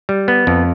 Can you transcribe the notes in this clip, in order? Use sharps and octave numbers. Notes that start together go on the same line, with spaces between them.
G3
B3
F2